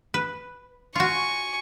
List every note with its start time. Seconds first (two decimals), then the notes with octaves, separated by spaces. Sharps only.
0.14 B4
0.95 F4 F#4 G#5 C#6